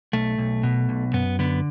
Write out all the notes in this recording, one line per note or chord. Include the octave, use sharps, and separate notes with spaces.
B1 A3
B1
B2
B1
F#2 B3
D3 B3